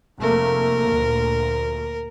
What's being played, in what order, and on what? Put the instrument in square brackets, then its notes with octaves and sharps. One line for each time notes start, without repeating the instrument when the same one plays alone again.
[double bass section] F1 A3 A#3 [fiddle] A#4
[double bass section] D2 A#2